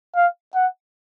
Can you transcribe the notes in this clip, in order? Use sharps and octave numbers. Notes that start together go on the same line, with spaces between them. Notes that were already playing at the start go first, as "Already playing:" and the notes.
F5
F#5